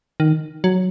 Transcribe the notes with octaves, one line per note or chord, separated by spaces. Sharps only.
D#3
F#3